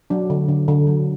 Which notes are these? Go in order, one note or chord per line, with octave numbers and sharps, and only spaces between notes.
F#3 D4
D3
D3
D3
F#3